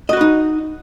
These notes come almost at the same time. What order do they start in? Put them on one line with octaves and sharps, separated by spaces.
D#5 F#4 B4 D#4